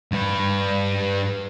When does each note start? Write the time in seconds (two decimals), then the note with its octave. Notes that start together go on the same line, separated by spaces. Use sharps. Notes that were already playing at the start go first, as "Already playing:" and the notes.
0.12 G2 B4